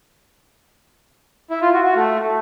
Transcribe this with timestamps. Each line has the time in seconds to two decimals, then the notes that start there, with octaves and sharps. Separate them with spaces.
1.50 E4
1.62 F4
1.73 F#4
1.84 F#4
1.96 A3